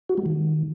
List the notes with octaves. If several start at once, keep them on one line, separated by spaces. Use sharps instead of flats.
F#4
G#3
D#3